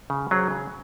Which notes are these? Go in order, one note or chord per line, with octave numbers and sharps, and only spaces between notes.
C#3
F#3 C#4 G#4 C5
C#3